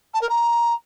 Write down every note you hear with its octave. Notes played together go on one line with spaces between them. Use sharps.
A5
A#4
A#5